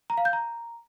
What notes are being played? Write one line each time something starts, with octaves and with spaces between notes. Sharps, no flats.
A#5
F5
G6
A#5